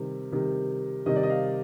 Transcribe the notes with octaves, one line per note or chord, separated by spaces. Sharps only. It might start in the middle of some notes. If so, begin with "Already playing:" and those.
Already playing: C3 D#3 G3
C3 D#3 G3
C3 D#3 G3 D#5
D5
D#5
F5